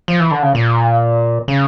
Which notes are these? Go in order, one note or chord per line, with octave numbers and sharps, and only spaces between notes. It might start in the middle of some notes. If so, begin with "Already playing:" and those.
F3
E3
D3
C#3
A#2
C#3